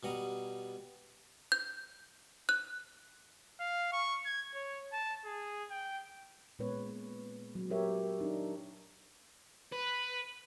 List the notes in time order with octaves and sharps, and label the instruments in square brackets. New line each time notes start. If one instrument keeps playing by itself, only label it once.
[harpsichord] B2 G3 F#5 A#5 D#6
[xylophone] G6
F#6
[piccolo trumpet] F5
C#6
G#6
C#5
A5
G#4
G5
[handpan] A#2 G#3 B3 B4 C#5
F#3
F#3 G4 A#4 C#5 E5
D4 D#4
[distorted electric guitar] B4